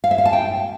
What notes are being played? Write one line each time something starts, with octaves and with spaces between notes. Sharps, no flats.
F5
E5
F5
A5
G5